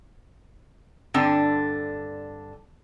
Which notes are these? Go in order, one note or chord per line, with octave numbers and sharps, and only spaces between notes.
G2 D3 C4 D4 G5